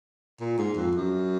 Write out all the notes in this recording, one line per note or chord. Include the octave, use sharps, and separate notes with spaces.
A#2
G#2
F2
F#2